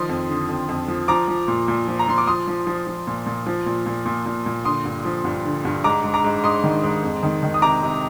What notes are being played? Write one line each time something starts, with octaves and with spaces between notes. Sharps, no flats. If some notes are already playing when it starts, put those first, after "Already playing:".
Already playing: D#3 F3 C6 D#6
F2
D3
F2
F2
F3
F3 A#5 D6
F3
A#2
A#2
F3
A#5
F3 C6
D6
F3 C6 D#6
F3
F3
F3
A#2
A#2
F3
A#2
A#2
A#2
A#2
A#2
D3 C6 D#6
G2
F3
G2
D3
G2
G#2 A#5 D6
G#2
A#5 D6
G#2
G#2 C6 D#6
D#3
G#2
F2
D#3
D#3
D#6
C3 A#5 D6
C3